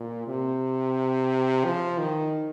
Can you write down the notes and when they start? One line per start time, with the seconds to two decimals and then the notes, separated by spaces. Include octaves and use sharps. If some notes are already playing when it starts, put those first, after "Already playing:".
Already playing: A#2
0.27 C3
1.65 F3
1.98 D#3